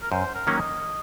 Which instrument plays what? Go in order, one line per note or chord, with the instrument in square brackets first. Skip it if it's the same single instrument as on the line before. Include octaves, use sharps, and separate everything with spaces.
[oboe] A#4
[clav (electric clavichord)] F#2 [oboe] C5
[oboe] A#4
[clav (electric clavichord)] D#3 F#3 A#3 C#4
[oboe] D#5